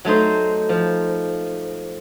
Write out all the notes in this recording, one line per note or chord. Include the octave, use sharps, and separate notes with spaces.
F#3 A3 D#4 C5
F3